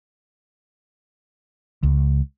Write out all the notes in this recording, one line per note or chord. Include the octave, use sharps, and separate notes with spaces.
C#2